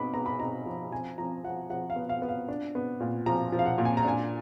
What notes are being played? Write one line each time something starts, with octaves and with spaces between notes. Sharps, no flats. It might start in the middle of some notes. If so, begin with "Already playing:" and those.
Already playing: B3 D#4 B5 D6
B3 A#5
B5
D#4 A#5
F3
F3 G#5
F3 A#5
F3 F#5
F3 F#5
F5
B3
F5
B3
F5
D4
B3
A#2
F3 A#5
F3
F5
F#5
A#2
G#5
A#5
D4 G#5